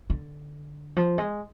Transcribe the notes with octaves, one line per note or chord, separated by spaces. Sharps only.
D3
F3
G#3